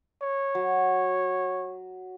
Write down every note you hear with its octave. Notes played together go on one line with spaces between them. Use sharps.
C#5
F#3